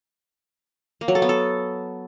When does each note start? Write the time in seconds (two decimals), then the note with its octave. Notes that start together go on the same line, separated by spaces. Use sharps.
1.01 A#3
1.08 F#3
1.15 A4
1.22 B3
1.29 A4